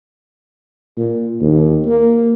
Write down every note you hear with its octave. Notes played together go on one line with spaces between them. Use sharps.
A#2
D#2
A#3